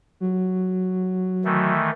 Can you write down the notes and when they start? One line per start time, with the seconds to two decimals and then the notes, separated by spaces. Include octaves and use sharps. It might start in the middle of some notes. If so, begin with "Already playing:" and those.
0.20 F#3
1.45 D#3 E3 A3